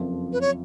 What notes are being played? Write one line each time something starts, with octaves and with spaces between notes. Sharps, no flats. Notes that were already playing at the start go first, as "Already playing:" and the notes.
Already playing: F#1 F2 F3
B4
C#5